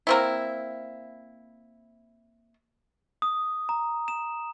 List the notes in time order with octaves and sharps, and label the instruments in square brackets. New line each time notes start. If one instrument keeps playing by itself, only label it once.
[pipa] A#3 C4 E4
[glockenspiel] D#6
A#5
E7